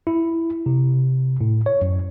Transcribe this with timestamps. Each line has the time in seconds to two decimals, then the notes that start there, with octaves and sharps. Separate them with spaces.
0.07 E4
0.66 C3
1.41 A2
1.66 C#5
1.81 F#2